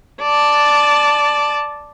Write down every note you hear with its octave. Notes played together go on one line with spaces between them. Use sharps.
D5 A5